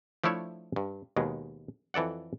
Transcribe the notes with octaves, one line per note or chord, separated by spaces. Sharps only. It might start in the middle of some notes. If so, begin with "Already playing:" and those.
F3 A3 D4 E4 C#5 E5
G2
D#2 B2 G#3
F2 E3 A4 D5 F#5